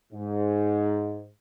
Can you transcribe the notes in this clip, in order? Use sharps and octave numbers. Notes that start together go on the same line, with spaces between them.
G#2